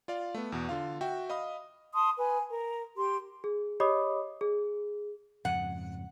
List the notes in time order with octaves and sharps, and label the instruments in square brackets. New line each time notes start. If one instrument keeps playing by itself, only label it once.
[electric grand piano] F4 D5 F5
A3 B3
E2 B2
D3 F4 F5
F#4 E5 G5
D#5 F5 B5 D#6
[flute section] A5 C6 D#6
B4 G#5
A#4
G4 C6
[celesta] G#4
G4 C#5 D#5 B5 D6 D#6
G#4
[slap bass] F2 G#2 C#3 [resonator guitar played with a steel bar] F#5